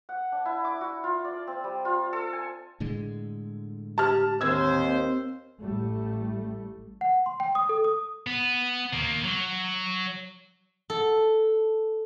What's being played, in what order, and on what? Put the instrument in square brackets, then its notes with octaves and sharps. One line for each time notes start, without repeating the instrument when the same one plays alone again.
[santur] F#5
D4
E4
D6
F#4
F4
D5
C4
G3
F4
A4
G#5
[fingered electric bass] A2 D3 G#3
[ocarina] G4 [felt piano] A5 F6
[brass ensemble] D#2 C5 [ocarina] C4 [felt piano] E6 G#6
[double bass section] A1 G3 A3
[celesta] F#5
C6
G5
D#6
A4
D#6
[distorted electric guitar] B3
D#3 A#3
F#3
[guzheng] A4